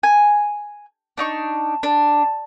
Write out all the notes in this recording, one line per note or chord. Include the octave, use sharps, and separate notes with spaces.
G#5
D4 D#4 C#6
D4